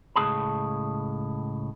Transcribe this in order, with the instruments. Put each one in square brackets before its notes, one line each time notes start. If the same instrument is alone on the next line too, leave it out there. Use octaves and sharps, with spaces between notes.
[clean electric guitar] C#2 A2 A#3 G#4 A5 B5